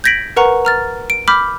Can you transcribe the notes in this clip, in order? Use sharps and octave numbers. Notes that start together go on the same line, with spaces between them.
G6 G#6 A#6 B6 D7 F#7
A#4 B4 F#5 A#5 C#6
A#5 F6 A6
D7
B5 D6 F6 G6 B6